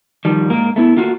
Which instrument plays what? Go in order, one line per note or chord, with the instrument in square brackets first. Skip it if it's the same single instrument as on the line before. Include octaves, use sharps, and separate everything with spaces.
[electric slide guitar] D#3 F3 G3
G#2 A#3 A#4
A3 B3 E4
A3 A#3 F4 F#4